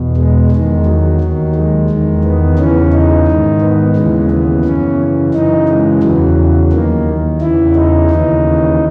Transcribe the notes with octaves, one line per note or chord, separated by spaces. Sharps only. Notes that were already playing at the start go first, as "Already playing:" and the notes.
Already playing: E2 B2
G#3
E2 D#3 G#3
F#3
D#2 D#3
G#3
E2 D#3
B3
E2 C#3 E3 C#4
D#4
G#2 D#3
B3
D#2 C#3 E3 G#3
B3
F#2 C#3 E3 C#4
F#2 C#3 E3 D#4
G#3
E2 C#3 E3 F#3
D#2 D#3 A#3
E2 C#3 E3 E4
D#4
D#2 C#3 E3